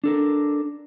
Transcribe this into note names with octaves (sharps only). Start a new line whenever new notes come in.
D4 A4 A#4